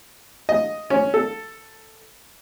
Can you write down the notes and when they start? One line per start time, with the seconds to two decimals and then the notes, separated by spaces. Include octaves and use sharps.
0.49 D#5
0.90 C#4
1.14 A4